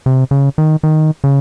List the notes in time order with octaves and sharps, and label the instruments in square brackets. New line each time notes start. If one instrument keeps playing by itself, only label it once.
[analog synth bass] C3
C#3
D#3
D#3
C#3